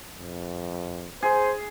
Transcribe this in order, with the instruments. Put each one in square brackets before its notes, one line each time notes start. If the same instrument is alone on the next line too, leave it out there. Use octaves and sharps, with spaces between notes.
[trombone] F2
[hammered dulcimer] G#4 [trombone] C5